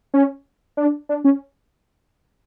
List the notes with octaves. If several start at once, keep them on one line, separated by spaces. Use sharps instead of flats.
C#4
D4
D4
C#4